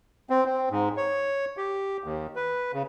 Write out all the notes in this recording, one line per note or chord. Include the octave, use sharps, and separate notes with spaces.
C4
C4
G#2
C#5
G4
D#2
B4
C#3